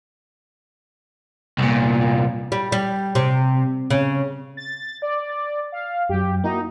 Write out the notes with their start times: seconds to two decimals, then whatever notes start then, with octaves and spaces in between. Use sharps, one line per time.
1.58 C2 A#2
2.52 G3
2.72 G3
3.15 C3
3.90 C#3
4.57 A6
5.02 D5
5.30 A6
5.72 F5
6.09 F#2 F#3 G4
6.44 A#3 D#4 E4 F#4